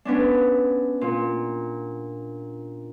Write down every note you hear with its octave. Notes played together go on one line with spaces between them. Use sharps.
B3 C#4 D4
A#2